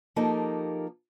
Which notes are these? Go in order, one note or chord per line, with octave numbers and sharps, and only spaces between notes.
F3 A#3 D#4 G4 A4 A#4